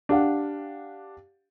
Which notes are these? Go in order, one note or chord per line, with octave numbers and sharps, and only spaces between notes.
D4 G4 F5 F#5